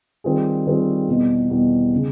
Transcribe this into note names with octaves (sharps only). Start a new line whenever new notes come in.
D#3 G3 C4 F4 G#4
D#3 G3 C4 F4 G#4
E2 B2 G3
E2 B2 G3
C#3